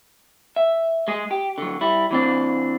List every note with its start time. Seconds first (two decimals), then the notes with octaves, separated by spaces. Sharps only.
0.56 E5
1.08 G#3 G#4
1.31 G4
1.58 D3 F#3
1.81 G3 E4
2.11 E3 C4 D4